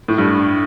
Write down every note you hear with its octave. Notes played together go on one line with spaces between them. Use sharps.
A2
G2